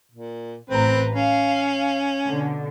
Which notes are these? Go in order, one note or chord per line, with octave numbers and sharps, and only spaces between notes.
A#2
A1 C4 B4 A#5
C#4 F5
B2 D3